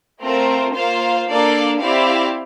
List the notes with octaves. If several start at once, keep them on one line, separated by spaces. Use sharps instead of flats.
A3 C4 F4 A#4
A#3 F4 C5 F5
A#3 D4 A4 D5 F5
C4 E4 G4 D5 F5